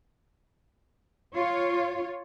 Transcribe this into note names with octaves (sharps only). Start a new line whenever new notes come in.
F4 C#5